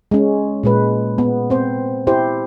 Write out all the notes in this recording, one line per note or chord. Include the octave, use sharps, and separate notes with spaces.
G#3 C#4
A#2 G#3 B4
B3
C4 C5
E4 G4 C5